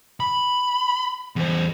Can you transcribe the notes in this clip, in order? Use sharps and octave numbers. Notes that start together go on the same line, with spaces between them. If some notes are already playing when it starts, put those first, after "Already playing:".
B5
E2 C5